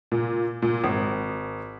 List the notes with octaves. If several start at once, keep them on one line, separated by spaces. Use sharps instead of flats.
A#2
A#2
G#1